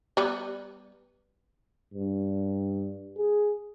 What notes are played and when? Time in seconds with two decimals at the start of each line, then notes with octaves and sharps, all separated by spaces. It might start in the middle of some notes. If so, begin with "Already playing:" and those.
0.17 G3 B3
1.94 G2
3.17 G#4